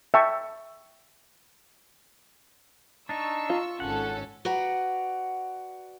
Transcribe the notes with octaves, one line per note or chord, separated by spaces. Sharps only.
E5 G5 A5 C#6
D4 D#4 C#6 E6
F4
G#1 C#4 A4 F#5
F#4 B4 D5 F#5 A#5